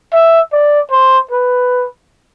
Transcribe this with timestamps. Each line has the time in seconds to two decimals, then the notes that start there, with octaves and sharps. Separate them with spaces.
0.13 E5
0.53 D5
0.91 C5
1.31 B4